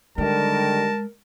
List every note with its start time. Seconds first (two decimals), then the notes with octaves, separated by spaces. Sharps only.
0.18 D3 D#3 G3 G#3 A#4 A5